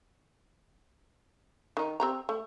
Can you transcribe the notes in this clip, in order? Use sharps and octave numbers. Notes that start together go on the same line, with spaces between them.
D#3 D#4
C4 G4 A#5
A3